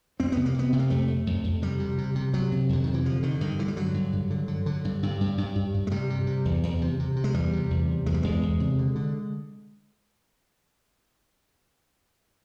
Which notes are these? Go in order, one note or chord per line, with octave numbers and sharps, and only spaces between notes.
F2 C4
C3 B3
A#3
C3 B3
C3
A#3
F2 A3
F2
F2
F2
C3 G3
C3
C3
C3
C3 F#3
C3
F2 D3
C3 D#3
E3
D3 F3
D3 D#3
G2 D#3
D3 E3
G3
D3 F#3
G2
G2
D3
D3
D3
G2
G2
G2
G2
G2
G2
G#3
C3 G3
C3
C3
E2
E2
C3
C3
C3
G#3
E2 G3
C3
E2
C3
E2 G#3
G3
E2 G#3
E2
C3
D3
D3